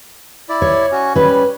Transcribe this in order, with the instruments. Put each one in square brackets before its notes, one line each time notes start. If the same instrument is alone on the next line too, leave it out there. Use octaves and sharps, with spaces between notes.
[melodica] E4 D5
[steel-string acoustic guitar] C#5
[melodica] C#4 F#4
[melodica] G3 [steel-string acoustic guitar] C#4 B4